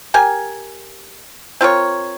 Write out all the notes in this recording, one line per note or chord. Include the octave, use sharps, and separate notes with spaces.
G4 A#4 G#5
C4 F4 A#4 C#5